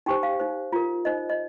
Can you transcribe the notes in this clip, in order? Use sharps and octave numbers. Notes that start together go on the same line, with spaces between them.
D#4 G4 C5 G5
F5
D#4 C5
F4 A#4
D#4 C5 D#5
D#5